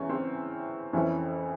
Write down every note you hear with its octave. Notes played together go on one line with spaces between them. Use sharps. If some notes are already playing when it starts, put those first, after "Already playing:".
Already playing: E2 E3 C#4
C4
F2 E3 C#4